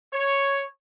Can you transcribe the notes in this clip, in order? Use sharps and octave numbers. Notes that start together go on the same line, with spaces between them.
C#5